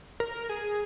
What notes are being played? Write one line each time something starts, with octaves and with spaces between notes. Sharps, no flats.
A#4
G#4